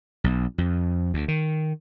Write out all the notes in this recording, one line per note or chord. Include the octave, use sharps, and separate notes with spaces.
B1
F2
D2
D#3